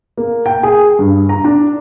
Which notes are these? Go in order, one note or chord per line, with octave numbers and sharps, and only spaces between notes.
A#3
G5
G#4
G2
A#5
D4